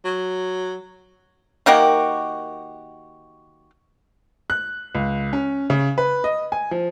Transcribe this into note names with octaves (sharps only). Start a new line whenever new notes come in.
F#3
D#3 A#3 F#4 G4
F#6
C#2
C#4
C#3
B4
D#5
G#5
F3